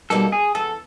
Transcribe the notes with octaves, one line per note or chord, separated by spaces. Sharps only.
B2 G3 A#3 D#4 A4
G#4
E2 A4